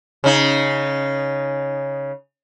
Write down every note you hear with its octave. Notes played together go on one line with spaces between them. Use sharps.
C#3 D#4